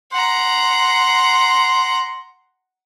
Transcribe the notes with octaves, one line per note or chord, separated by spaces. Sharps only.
F#5 A#5 C6